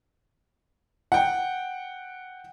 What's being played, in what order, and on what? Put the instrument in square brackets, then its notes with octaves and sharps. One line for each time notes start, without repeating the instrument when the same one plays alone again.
[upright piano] F#5 G5